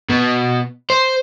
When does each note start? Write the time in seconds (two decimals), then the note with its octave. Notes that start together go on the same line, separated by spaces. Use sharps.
0.10 B2
0.90 C5